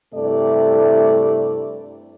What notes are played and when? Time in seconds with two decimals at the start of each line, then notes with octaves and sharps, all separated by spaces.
0.14 G2 C3 A3 E4 A4 D5